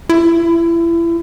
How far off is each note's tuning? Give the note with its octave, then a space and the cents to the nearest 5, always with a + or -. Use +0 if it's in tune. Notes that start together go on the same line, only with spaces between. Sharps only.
E4 +30